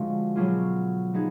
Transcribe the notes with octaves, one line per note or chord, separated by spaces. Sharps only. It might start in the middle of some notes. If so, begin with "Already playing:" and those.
Already playing: D3 F3 G#3 F#4
B2 F#3 D4 F4 G#4
F3 B3 D#4 G#4